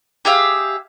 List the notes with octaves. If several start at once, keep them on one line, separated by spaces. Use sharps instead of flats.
G4 G#4 E5 F5